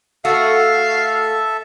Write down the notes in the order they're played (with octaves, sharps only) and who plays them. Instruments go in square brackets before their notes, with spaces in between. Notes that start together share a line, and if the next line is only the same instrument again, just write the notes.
[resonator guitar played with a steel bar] A3 F#4 [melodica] A4 E5 A5 [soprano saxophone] F5